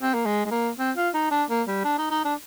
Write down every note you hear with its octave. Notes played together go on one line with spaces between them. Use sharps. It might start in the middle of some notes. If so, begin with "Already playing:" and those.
C4
A#3
G#3
G#3
A#3
C4
F4
D#4
D4
A#3
G3
D4
D#4
D#4
D4